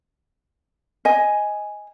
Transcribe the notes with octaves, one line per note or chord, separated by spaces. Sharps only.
D#5 G#5